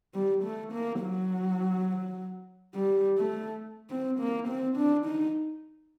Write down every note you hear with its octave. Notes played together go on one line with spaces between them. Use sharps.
G3
A3
A#3
F#3
G3
A3
C4
A#3
C4
D4
D#4